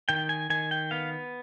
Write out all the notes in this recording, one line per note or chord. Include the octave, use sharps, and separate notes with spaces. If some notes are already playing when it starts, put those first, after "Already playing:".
D#3 G5
G#5
D#3 G#5
G5
B3 F5